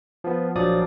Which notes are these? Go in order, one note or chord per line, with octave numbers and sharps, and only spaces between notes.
F3 B3
A#1 F3 F#3 D5 D#6